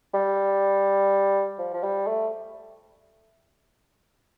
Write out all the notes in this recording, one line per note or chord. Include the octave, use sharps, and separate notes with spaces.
G3
F3
F3
G3
A3